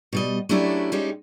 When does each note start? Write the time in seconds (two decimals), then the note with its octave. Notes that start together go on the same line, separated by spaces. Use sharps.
0.12 B2 G3 D#5
0.49 F#3 A3 C#4 D4 E4 G4
0.92 G3 G#3 C#4 D#4 G4